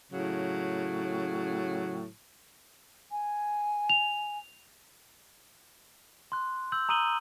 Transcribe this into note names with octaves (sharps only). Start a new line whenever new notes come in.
A2 C#3 F#3
G#5
F7
C6 F#6
E6 G6 F#7
A#5 D#6 E6 D#7 F#7 G7